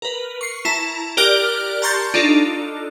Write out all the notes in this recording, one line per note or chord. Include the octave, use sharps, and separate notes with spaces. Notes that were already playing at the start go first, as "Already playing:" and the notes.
A#4 B4
C#6 C7
E4 A5 A#5
G4 A#4 D5 F6 F#6
A5 A#5 C6 C#6 G6 A6
D4 D#4 F4 A4